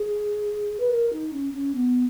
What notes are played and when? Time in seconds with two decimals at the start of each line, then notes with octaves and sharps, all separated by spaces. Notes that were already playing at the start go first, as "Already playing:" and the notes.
Already playing: G#4
0.80 B4
0.91 A#4
1.12 D#4
1.33 C#4
1.53 C#4
1.75 B3